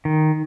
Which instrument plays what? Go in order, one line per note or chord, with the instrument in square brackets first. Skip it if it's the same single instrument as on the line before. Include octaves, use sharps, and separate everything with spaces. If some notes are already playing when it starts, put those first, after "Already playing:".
[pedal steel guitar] D#3